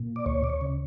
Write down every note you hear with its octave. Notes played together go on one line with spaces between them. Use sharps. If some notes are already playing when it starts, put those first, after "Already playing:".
Already playing: A#2
D5
D2 C#5
D5
C#5
C#3